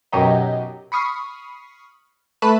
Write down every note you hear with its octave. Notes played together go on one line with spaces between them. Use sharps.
F#2 B2 F#3 D#4 G4 D#5
B5 C#6 D#6 F6 C7
A3 B4 A5 B5 F#6 B6